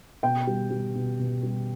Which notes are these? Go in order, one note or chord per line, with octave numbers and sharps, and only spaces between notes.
B2 G5
G3
G3
B2
B2
G3